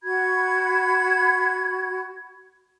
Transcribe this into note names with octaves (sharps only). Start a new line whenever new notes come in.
F#4 B5 G#6